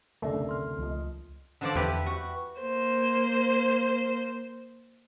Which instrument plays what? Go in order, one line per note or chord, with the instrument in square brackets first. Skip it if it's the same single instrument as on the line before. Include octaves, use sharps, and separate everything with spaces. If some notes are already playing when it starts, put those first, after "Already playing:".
[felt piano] F#1 D2 C3 [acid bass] A3 [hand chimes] A#4 D5 E5
[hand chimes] C6 F6
[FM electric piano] C#2 [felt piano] F3 D#5
[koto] D3 F3 D5
[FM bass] E2 [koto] E4 G4 B4
[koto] F#4
[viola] A#3 C5